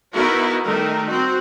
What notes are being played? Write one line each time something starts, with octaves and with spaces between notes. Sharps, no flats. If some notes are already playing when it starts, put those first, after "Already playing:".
B3 D#4 E4 F#4 A#4
D#3 G3 A3 A#4
C4 F#4